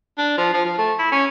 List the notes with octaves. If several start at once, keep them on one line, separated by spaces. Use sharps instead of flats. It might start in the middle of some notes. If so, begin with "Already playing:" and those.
D4
F3
F3
F3
A3
E4
C#4